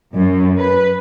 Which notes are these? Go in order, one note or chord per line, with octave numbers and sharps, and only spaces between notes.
F#2
B4